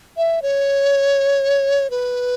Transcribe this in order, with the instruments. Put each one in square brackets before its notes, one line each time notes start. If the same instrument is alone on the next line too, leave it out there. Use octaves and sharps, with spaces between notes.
[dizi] E5
C#5
B4